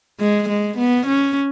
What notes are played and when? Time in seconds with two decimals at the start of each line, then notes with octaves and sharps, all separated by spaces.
0.20 G#3
0.49 G#3
0.77 B3
1.06 C#4